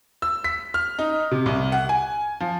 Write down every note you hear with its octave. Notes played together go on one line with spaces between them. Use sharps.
E6
B6
F6
D#4
C3
C2
F#5
G#5
F3